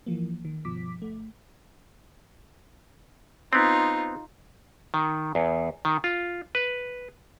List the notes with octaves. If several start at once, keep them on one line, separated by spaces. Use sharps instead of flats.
E3 F3 A#3
D#3
G2 B2 F3 D6 B6
G1 A3
B3 C4 D#4 F4
D#3
E2
D#3
F4
B4